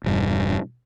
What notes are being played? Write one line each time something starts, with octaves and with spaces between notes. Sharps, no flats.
E1 G2